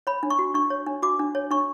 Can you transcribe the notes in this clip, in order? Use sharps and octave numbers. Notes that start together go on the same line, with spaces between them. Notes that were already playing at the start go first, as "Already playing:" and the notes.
C#5 B5
D4
C#6
F#4
D4 C#6
C#5
D4
F#4 D6
D4
C#5
D4 C#6